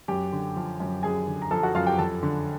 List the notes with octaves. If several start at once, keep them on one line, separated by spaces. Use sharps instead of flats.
F#2 G4 G5
D3
F3
F#2
F#2 G#4 G#5
D3
A#5
F3 A4 A5
F#4 F#5
F#2 F4 F5
G4 G5
F2 A4 A5
D3